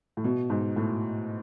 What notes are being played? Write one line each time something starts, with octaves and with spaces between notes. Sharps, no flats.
A2
B2
G#2
A2